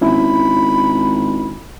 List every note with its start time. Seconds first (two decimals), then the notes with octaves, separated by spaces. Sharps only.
0.01 G#1 C#4 E4 B5